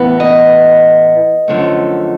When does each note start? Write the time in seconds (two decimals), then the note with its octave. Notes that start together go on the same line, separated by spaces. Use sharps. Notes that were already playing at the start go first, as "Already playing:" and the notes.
Already playing: A2 E3 B3
0.20 D#5
1.48 F#2 D3 F3 A3